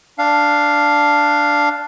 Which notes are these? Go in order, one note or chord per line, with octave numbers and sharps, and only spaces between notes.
D4 F5